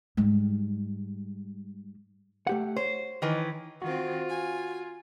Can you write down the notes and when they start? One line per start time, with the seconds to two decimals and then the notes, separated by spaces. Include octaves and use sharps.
0.17 G#2 G3
2.47 A3 G4 F#5
2.76 C5 C#5
3.22 D#3 E3 B4
3.82 D#3 C4 F4 F#4
4.28 G#5